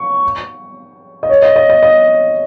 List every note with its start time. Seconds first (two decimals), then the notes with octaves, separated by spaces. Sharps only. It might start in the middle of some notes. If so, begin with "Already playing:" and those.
Already playing: C#6
1.23 D#5
1.29 C#5
1.42 D#5
1.56 D#5
1.70 D#5
1.82 D#5